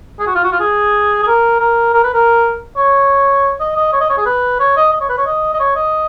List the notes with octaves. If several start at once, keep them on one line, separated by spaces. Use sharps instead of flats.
G#4
F#4
F4
F#4
F4
G#4
G#4
A#4
A#4
A#4
B4
A#4
C#5
D#5
D#5
C#5
D#5
C#5
G#4
B4
C#5
D#5
D#5
C#5
B4
C#5
D#5
D#5
C#5
D#5